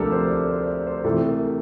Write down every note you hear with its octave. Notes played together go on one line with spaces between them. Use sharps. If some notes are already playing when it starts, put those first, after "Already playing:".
Already playing: D2 C3 F3 A3 D4 G4 A4 A#4
C5
D5
C5
D5
C5
C3 E3 A3 A4
A#4